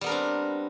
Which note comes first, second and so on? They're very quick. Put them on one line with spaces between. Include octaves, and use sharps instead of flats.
G3 B3 A#4 D4 C4